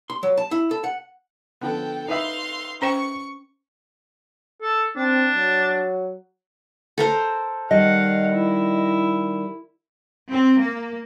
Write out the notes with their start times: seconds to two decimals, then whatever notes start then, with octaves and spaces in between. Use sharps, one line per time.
0.10 C6
0.23 F#3
0.37 A5
0.51 E4
0.71 A4
0.84 F#5
1.61 D3 F3 B3 A4 G5
2.08 D#4 B4 E5 F5 C6
2.82 C#4 C5 G5 C#6
4.62 A4
4.96 C4 D4
5.36 F#3
6.98 A4 A#4 C5
7.71 D#3 G3 D#5 F5 F#5
8.32 E4
10.30 C4
10.60 A#3